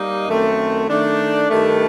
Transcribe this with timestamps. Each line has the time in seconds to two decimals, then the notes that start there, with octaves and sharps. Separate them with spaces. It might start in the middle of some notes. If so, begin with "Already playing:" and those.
Already playing: G3 A#3 D#4
0.27 F#2 D#3 A3 C4
0.88 D#3 A3 D4
1.49 G2 D#3 A3